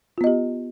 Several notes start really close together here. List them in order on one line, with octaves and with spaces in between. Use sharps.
F4 B3 D#5 G4